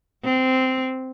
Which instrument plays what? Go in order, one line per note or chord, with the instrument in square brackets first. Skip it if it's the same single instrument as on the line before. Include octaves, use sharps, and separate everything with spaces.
[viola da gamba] C4